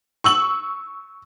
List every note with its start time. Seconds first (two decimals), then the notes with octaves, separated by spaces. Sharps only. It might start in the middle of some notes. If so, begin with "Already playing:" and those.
0.24 C#6 E6 F#7